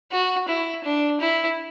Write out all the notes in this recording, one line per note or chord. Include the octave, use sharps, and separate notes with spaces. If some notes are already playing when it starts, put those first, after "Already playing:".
F#4
E4
D4
E4